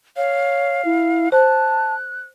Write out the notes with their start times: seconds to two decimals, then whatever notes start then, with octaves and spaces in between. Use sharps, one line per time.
0.17 C#5 F5
0.85 E4
1.32 C5 A5 F#6